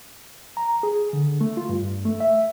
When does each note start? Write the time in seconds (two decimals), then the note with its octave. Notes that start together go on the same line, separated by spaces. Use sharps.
0.57 A#5
0.83 G#4
1.13 D3
1.41 A3
1.57 F4
1.69 G2
2.05 A3
2.20 E5